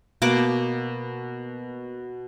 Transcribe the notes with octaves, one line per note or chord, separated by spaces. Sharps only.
B2 A#3 F#5 D6